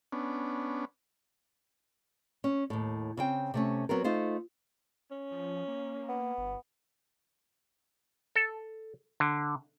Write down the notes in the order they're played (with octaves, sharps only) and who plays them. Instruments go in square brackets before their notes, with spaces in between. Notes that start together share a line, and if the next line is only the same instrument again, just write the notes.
[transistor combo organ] B3 C#4 D4
[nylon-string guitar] C#4
D#2 A2
C#3 C4 G5
C3 A3 C#4
F#3 B3 C4 A#4
A3 D#4 F4 C5
[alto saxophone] C#4
[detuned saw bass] F3
A#3
[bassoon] B3
[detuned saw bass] G1
[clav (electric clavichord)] A4
D3